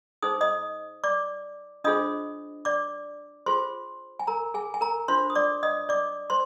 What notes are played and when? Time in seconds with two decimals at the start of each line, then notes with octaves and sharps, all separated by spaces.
0.23 D#4 G#4 C5 D#6
0.41 D#5 D#6
1.04 D5 D6
1.84 D4 F4 G#4 C5 D#5 D#6
2.65 D5 D6
3.46 F4 G#4 C5 C6
4.20 G#5
4.27 A#4 A#5
4.54 G#4 G#5
4.74 G#5
4.81 A#4 A#5
5.08 D4 F4 C5 C6
5.30 D#6
5.35 D5 D6
5.63 D#5 D#6
5.89 D5 D6
6.30 C5 C6